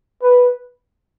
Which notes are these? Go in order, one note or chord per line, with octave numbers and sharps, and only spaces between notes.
B4